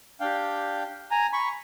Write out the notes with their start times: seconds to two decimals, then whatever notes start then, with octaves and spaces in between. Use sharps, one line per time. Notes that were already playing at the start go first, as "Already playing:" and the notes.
0.20 D4 G4 F5 G5
1.11 G#5 A#5
1.33 B5 C#6